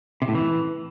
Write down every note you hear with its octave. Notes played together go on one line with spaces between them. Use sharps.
C3
A2
E3